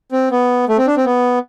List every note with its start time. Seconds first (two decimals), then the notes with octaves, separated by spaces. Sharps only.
0.12 C4
0.31 B3
0.69 A3
0.78 C4
0.87 D4
0.97 C4
1.05 B3